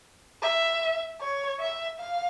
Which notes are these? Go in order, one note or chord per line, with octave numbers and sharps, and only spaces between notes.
E5
C#5
E5
F5